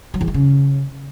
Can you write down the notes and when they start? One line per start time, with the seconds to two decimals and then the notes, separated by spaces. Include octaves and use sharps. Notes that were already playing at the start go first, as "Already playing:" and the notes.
0.14 F#3
0.21 E2
0.27 E3
0.34 C#3